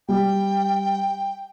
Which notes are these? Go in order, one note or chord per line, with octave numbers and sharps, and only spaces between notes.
G3 G5